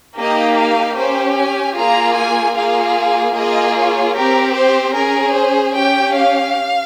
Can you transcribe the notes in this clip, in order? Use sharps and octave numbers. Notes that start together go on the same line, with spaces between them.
A#3 D#4 G4 D#5
F5
C#4 G4 C5
G#5
A#3 F4 G#4 A#5
G#5
A#3 F4 G#4 F5
A#3 F4 G#4 D#5
C#5
C4 G4 A#4
C5
C#4 G#4 A#4
C5
C#4 G4 G5
F5